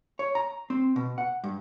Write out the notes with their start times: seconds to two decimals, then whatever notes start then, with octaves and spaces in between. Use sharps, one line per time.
0.19 C#5
0.35 A#5
0.70 C4
0.96 B2
1.18 F#5
1.44 G2